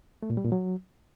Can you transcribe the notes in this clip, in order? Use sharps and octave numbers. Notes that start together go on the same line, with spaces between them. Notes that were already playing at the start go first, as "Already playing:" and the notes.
A3
A#2
G3
A#2
F#3